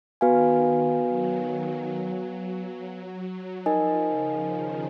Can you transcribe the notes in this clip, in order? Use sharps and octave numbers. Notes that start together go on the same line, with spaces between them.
D#3 B3 F#4 B4 F5 G#5
D#3
F#3
F3 D#4 A#4 D#5 G#5
C#3
D#3